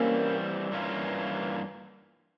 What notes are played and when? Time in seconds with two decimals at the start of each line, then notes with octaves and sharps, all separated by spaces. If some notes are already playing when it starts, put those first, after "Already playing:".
Already playing: E3 G3 A#3 C4 C#4
0.71 G2 E3 A#3 C#4 F4